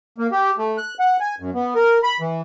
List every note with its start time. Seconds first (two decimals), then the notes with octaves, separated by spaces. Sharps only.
0.18 A#3
0.31 G4
0.58 A3
0.78 F#6
0.99 F#5
1.20 G#5
1.40 F#2
1.54 B3
1.75 A#4
2.03 B5
2.20 E3